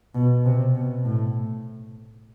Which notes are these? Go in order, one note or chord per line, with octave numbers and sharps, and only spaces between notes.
B2
C3
B2
A2